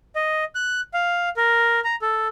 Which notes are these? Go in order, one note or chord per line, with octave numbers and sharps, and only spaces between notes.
D#5
F#6
F5
A#4
A#5
A4